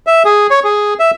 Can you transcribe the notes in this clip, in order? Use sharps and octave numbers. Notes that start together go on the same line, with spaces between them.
E5
G#4
C#5
G#4
E5